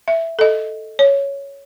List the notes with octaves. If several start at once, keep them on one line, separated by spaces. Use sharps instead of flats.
E5
A4 D#5
C#5